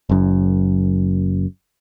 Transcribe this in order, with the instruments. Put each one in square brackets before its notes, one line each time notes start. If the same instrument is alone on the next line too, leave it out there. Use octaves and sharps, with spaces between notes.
[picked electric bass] F#1 F#2